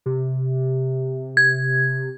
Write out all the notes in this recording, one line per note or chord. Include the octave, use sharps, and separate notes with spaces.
C3
G#6